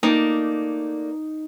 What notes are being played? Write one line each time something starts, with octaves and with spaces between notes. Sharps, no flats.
A3 A#3 D#4 D5